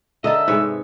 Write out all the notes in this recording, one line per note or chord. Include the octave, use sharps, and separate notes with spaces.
D3 A4 A#4 D#5 E5
G#2 C3 G#3 B4 C#5